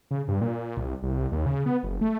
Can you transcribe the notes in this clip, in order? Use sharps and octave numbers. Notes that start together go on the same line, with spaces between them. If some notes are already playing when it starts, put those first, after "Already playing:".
C#3
G2
A#2
C2
C2
D#2
C#3
B3
F#1
A3